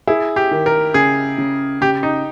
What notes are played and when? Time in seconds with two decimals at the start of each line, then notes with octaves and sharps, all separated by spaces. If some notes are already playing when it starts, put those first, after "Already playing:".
0.07 E4 G#4
0.36 G4
0.51 D#3
0.66 A#4
0.94 C#3 G#4
1.38 C#3
1.81 C#3 G4
2.03 D#4